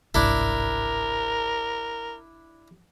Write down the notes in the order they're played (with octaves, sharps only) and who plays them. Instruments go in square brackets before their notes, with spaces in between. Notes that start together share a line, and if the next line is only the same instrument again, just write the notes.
[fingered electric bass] G1 C2 G#2 [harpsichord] D4 E4 [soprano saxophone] A#4